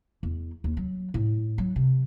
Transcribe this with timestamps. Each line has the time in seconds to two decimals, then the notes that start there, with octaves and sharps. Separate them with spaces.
0.23 E2
0.64 D#2
0.77 F#3
1.14 A2
1.58 F#3
1.76 C3